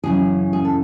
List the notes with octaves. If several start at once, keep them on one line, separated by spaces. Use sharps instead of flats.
F#2 C#3 E3 G#4
G#4
A4